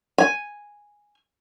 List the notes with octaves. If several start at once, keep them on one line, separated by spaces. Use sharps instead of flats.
G#5